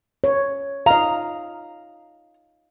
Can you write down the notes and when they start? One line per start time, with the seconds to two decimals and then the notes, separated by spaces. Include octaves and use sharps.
0.24 C#5
0.86 D#5 F5 A#5